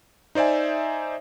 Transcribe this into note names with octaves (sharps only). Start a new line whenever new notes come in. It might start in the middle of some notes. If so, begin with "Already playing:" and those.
D#4 C5 D5 E5 G#5